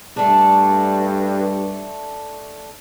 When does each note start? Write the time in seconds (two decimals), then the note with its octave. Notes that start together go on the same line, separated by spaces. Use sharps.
0.17 G2 A3 D4